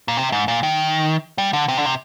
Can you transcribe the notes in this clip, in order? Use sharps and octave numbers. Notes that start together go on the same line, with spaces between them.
A#2
C3
G#2
A#2
D#3
G3
D3
C3
D3
C3